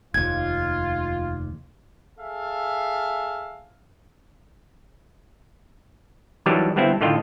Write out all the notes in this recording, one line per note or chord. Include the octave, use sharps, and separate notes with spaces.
F1 D#2 F4 G#6
G#4 A4 E5 F5
D#3 E3 F#3 G3 D4 G4
G1 G2 B3 C4 E4
A2 D3 D#3 F4 D#5 G5